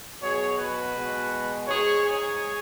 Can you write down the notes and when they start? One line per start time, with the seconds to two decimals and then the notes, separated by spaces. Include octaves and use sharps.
0.22 B2 F#3 G#4 C#5
0.58 F#4 B4
0.95 B2 G#3
1.68 G#2 G#3 G#4 C#5
2.04 G#4 C#5